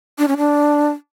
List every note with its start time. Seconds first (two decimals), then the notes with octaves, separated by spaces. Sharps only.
0.18 D4
0.28 C#4
0.37 D4